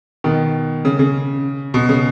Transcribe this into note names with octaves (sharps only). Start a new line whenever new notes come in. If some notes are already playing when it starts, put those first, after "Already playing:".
B2 D#3
C#3
C#3
B2
C#3